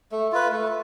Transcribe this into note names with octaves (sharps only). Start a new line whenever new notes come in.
A3
F4 B4
A3